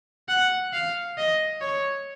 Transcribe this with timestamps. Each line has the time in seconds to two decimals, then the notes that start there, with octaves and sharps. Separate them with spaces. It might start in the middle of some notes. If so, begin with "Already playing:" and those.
0.29 F#5
0.74 F5
1.18 D#5
1.61 C#5